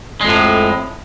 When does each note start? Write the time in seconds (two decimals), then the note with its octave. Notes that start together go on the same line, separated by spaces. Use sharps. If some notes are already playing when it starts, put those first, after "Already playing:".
0.21 G#3
0.25 F2
0.28 A2